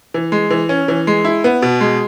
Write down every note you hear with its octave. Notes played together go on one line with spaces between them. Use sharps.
E3
G#3
E3
C#4
E3
G#3
E4
B3
B2
G#3